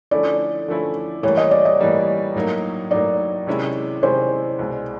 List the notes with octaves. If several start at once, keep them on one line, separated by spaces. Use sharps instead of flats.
D3 F3 A3 C#4 E4 D5
D3 F3 A3 C#4 E4
A2 E3 G3 A#3 C#5
D#5
D5
D#5
A2 E3 G3 A#3
A2 F#3 A#3 D#4
A2 F#3 A#3 D#4 D5
C3 D#3 G#3 C#4 E4
C3 D#3 G#3 C#4 E4 C5
C2 B2 G#3